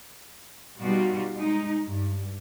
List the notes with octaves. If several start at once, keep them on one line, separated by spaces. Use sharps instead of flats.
B2 G3 D#4 F4 F#4
G#3 D#4
G2